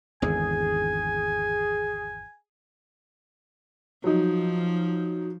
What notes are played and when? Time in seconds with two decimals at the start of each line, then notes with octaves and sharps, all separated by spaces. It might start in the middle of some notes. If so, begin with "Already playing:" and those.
0.22 G#1 E2 D3 G#4 G#5
4.04 F3 F#3 D#4